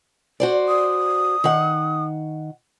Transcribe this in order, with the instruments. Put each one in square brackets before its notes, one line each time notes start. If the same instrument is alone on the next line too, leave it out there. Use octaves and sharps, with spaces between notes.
[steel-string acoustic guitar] F#4 C5 D5
[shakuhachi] D#6
[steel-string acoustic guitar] D#3 F#5